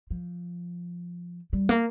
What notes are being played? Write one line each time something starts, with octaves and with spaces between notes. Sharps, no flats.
F3
G3
A#3